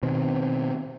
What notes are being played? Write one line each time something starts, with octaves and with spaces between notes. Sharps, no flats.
B2 D#3 C4